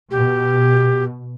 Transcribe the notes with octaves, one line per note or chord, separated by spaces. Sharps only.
B2 G4